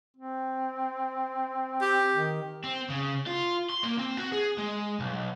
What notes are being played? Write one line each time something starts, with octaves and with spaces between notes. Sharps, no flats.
C4
G4
D#3
C4
C#3
F4
C6
A#3
C4
F#4
G#4
G#3
B1